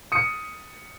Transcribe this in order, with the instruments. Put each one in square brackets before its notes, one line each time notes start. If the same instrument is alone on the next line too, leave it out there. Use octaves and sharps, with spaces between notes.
[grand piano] D#6 C#7